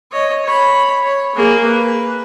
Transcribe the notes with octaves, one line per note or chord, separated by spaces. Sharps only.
C#5 D#5
C#5 B5
C#5
A#3 G#4
B4